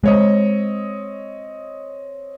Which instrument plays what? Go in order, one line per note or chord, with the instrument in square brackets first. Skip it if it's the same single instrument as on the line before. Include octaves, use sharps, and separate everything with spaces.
[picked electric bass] G#3 [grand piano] C4 C#5 D#5